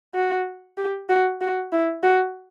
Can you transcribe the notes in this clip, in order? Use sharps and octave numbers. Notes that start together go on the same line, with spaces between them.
F#4
G4
F#4
F#4
E4
F#4